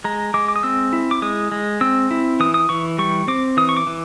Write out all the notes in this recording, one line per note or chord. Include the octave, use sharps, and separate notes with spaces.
G#3 A#5
G#3 D6
D6
D#6
C4 E6
E4
D6
G#3 D#6
G#3
C4 E6
E4
E3 D#6
D#6
E3 C#6
G3 C#6
C4 D6
E3 D#6
C#6
D6
E3